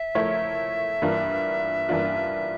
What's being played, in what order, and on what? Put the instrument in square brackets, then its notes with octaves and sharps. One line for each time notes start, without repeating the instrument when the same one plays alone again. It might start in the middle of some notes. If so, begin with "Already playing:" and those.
Already playing: [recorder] E5
[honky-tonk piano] F3 A3 E4 A#4 C#5
G2 E3 A#3 D4 F4
G2 E3 A#3 D4 F4